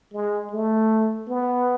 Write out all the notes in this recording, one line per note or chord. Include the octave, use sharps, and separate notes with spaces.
G#3
A3
B3